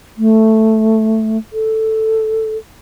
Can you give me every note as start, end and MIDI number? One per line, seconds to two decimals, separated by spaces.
0.18 1.38 57
1.53 2.57 69